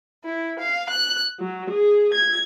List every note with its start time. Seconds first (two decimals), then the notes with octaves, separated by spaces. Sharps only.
0.23 E4
0.58 F5
0.88 F#6
1.40 F#3
1.70 G#4
2.14 G#6